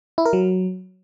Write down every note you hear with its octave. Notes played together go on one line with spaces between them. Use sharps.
E4
A#4
F#3